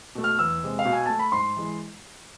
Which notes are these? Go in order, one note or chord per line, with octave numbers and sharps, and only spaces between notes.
B2 A3
F6
E2 E6
C3 G#3
F5
B2
G#5
A3 A5
B5
G#2 C6
E3 G#3